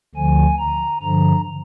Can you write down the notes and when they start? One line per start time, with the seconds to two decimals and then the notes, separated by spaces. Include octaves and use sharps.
0.15 D2 D3 F3 G#5
0.59 A#5
1.02 G2 D3 F3 A#5